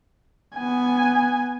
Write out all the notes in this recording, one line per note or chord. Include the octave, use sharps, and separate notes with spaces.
B3 G#5